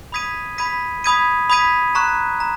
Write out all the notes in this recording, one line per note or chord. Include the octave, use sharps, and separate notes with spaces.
B5 D#6 G#6 B6 D#7
B5 D#6 G#6 B6 D#7
B5 D#6 G#6 B6 D#7
B5 D#6 G#6 B6 D#7
A#5 C#6 F#6
A#5